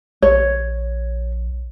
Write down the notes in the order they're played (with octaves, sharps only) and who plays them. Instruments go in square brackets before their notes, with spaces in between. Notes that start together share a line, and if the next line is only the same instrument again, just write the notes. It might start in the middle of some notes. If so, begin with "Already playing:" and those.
[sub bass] A#1 [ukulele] C#5